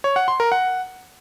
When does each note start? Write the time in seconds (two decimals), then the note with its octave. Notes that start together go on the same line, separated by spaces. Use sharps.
0.04 C#5
0.16 F#5
0.28 C6
0.40 A#4
0.52 F#5